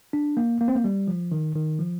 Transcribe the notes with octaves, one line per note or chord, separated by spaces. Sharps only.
D4
A#3
A#3
C4
A#3
G3
F3
D#3
D#3
F3